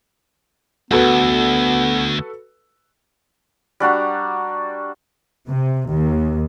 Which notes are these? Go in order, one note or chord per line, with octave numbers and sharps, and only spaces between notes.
D2 G#2 B3 F#4 A4 B4
G3 D4 F#4 A#5
C3
D#2